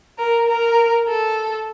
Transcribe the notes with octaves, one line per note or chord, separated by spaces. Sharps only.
A#4
A#4
A4